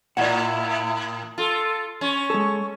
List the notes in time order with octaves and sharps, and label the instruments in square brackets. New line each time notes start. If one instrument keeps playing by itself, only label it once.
[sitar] A2 A#3 [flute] E4 [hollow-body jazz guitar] D5 F#5
[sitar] F4 [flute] A4
[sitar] C#4 [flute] C#6
[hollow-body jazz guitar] G#3 A4